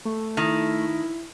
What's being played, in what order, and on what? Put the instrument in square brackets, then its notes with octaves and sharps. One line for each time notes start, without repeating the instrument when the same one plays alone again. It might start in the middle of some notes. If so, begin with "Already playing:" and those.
[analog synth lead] A3
[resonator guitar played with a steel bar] D#3 [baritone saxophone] E4